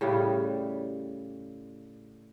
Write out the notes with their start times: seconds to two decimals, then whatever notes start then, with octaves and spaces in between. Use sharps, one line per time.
0.01 A2 C#3 G3